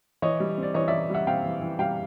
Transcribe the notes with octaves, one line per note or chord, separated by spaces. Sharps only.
E3 C#5 D#5
G3
C4
D5
E3 C#5 D#5
E3 D5 E5
G3 E5 F#5
C4 F5 G5
E3
E3
G3 F5 G5